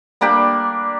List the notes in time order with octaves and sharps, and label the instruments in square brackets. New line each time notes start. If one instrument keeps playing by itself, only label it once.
[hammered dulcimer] G3 A#3 D4 G4